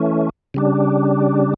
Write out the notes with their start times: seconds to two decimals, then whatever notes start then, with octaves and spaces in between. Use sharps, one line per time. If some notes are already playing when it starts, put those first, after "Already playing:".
Already playing: E3 A3 C#4
0.54 C#3 G3 D4